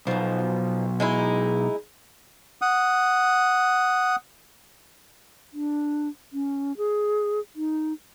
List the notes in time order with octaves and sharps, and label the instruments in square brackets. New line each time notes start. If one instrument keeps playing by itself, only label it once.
[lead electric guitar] B1 [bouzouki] B2 F3
[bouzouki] G#3 D#4 E4
[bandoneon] F#5 D#6
[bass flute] D4
C#4
G#4
D#4